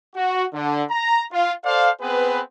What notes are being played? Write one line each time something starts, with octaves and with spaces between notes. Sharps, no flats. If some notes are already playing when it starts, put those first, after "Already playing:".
F#4
D3
A#5
F4 F5
A4 C5 D5 F5
B3 C4 G#4 B4